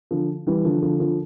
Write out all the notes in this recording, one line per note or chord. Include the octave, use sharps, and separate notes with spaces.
D3 F3
E3 G3
D3 F3
D3 F3
D3 F3